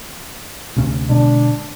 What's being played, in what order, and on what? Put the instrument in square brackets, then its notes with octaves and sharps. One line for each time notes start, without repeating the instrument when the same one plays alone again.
[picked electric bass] D2 C3 C#4
[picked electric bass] B2 D3 G#3 [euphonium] D4